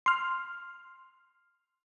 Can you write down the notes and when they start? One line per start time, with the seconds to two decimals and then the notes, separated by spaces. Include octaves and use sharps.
0.06 C6 F6